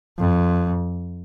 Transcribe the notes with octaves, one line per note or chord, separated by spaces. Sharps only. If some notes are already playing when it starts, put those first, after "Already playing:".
F2